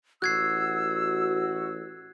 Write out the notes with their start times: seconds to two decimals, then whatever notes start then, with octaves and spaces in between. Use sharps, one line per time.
0.22 A1 F#4 E6 F#6 G#6 C7